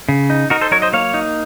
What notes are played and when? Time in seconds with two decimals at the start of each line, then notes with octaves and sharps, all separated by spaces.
0.09 C#3
0.30 D#4
0.50 D#4 F#4 A#4
0.61 A4 C5
0.71 F#3 A#4 C#5
0.82 C5 D#5
0.93 A#3 C#5 F5
1.14 D#4